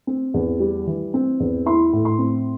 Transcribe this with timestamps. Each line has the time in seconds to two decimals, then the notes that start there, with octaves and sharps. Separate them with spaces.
0.07 C4
0.34 E2
0.60 G3
0.87 E3
1.14 C4
1.40 E2
1.66 E4 C6
1.93 A2
2.05 C6
2.19 C4